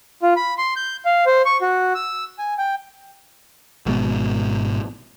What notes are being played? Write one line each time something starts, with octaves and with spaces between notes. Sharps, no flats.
F4
B5
C6
G6
F5
C5
C#6
F#4
E6
G#5
G5
G#1 G#2 B2